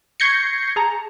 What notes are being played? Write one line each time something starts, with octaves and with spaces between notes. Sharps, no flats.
C#6 G6 G#6 A#6 C7 C#7
G#4 A5 A#5